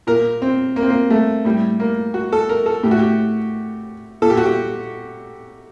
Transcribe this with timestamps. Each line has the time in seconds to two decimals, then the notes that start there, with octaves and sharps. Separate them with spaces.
0.07 A#2 A#4
0.42 C4
0.76 A#3
0.83 C4
0.90 A#3
1.10 A3
1.45 A2 G3
1.80 A#3
2.14 F#4
2.32 A4
2.49 A#4
2.66 A4
2.83 A2 G4
2.91 F#4
2.99 G4
4.22 A#2 A4
4.30 G4
4.37 F#4
4.45 G4